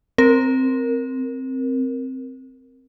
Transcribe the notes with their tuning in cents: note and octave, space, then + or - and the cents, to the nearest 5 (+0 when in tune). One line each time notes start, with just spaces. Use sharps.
C4 +0 A#4 +0